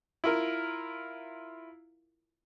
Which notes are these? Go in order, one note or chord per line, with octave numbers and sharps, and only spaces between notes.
E4 F4 A#4